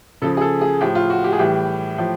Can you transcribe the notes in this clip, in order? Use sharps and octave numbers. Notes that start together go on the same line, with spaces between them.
C#3 F3 A4
G#4
A4
G#4
A2 F3 G4
F4
F#4
G4
G#4
A2 E3 G3 G4
A2 F3